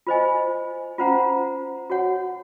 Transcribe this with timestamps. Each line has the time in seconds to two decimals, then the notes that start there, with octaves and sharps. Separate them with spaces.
0.07 F4 C5 D#5 G#5
0.98 C#4 F4 C5 F#5 A#5
1.90 F#4 C#5 F#5